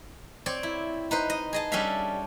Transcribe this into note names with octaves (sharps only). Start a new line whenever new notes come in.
C4 C#5 D5
E4
D#4 B4 C5
D#5
G#4 D#5 A5
G3 C#4 D4 A4 E5 F5